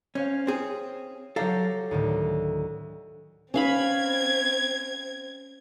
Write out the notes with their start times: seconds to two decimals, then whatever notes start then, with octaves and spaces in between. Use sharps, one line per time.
0.15 C#4 C5 C#5 F5
0.47 C4 G#4
1.36 F#3 G4 A4 F5 A#5
1.91 D2 A2 D#3
3.54 C4 C#4 F5 B5 G#6